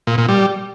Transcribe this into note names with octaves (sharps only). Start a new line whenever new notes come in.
A#2
A#2
G3